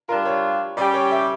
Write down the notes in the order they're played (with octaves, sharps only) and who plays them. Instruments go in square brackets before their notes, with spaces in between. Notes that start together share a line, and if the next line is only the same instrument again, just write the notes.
[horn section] G3 D4 F4 [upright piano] A#4
[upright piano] C#5
[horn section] G3 C#4 G4 [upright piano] D5
[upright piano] C#5
E5